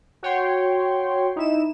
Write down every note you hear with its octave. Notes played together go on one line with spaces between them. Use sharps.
F#4 C#5 G5 C6
D#4 E4 E7